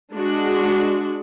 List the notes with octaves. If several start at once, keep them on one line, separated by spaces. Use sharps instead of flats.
G#3 D4 F#4